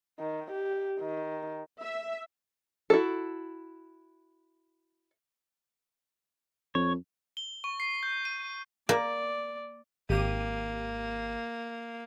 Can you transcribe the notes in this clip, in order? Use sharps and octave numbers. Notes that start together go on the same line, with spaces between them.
D#3
G4
D#3
E5
E4 F#4 A4
F2 C#5
G7
C#6
C7
G6
D#7
A#3 D5
G#1 A#3 G4 D#7